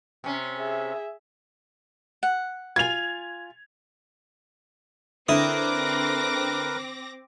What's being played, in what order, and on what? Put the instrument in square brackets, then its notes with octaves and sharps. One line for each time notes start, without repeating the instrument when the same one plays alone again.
[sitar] C3 C#4
[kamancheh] G#4 E5
[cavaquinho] F#5
[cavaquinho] F4 G#5 [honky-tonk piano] G#6 F7
[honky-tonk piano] D3 [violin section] C4 D6 A#6 [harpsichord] E4 D#6 [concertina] A#4 B4